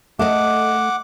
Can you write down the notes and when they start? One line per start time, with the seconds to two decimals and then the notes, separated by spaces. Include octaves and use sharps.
0.19 A3 A4 D#5 F#5 D6